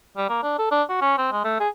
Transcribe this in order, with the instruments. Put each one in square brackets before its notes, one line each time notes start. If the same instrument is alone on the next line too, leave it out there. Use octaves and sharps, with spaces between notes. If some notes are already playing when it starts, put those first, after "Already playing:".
[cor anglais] G3
A#3
D4
A4
D4
F#4
C#4
C4
G#3
A3
G#4